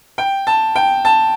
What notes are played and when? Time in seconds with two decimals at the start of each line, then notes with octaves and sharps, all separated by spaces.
0.18 G5
0.47 A5
0.76 G5
1.05 A5